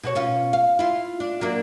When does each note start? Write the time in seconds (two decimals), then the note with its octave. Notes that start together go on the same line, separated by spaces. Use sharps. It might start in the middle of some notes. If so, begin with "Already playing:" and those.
0.03 B2 F#4 C#5
0.15 B2 C#4 F4
0.53 F5
0.79 E4 F4
1.20 D4
1.41 F#3 A#3 D4